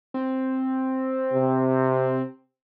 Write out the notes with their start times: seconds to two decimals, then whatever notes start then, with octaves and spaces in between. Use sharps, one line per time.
0.14 C4
1.33 C3